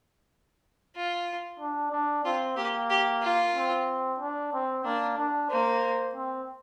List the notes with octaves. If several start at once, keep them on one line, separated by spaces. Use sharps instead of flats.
F4
D4
D4
C4 F4
A#3 G4
G4
F4
C4
D4
C4
A#3 D4
D4
A#3 C5
C4